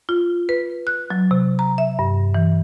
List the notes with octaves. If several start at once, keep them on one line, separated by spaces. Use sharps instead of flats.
F4
B4
F#6
F#3
C3
A#5
E5
G2
E3